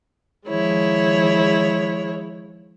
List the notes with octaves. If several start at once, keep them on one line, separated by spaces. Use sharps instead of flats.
D#3 F3 G#3 E4 C#5